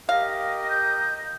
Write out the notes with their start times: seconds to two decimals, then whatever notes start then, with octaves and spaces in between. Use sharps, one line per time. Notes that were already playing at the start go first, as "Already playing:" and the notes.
0.09 G4 A#4 D#5 F5
0.70 G6